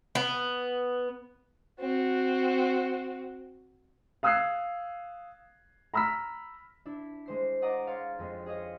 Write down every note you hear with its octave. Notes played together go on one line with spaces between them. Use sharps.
B3
C4 F#4
F5 D#6 E6 F#6 G#6 C7
A#5 B5 E6 F6 B6
D4 E4
G#3 C5 C7
D5 D#5 F#5 A#5 D6 D#6
C#5 F5 C6 A6 C#7
F2 G#3
G#4 C#5 D#5 F5